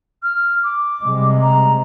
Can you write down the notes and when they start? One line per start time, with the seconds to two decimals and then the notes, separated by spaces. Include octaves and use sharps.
0.23 F6
0.63 D6
1.01 C3 G3 G#3
1.42 A#5